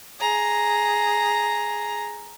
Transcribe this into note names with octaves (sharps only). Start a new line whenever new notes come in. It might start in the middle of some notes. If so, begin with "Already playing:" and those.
G#4 A#5